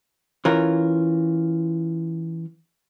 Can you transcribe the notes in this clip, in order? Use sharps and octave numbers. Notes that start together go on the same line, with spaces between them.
E3 C#4 F4 A#4